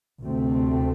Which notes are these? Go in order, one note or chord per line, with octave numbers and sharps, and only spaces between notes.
D2 C3 A3 C4